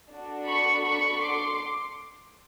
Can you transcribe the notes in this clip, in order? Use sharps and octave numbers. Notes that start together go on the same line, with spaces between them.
D4 F#4 A4
B5 C#6
B5 C#6
C6 D6